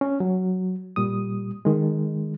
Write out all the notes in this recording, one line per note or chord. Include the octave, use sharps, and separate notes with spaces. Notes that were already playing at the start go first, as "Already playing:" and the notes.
C#4
F#3
A#2 G3 D#6
D#3 G#3